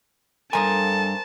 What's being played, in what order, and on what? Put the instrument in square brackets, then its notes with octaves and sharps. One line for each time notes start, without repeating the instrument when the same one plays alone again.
[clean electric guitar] G2 E3 G#5 [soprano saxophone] A4 [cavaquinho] A#4 C5 D#6 [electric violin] A5